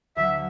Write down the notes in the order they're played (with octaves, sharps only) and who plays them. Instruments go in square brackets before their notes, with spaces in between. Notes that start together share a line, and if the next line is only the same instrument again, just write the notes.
[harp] D2 D3 F#3 [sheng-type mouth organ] E5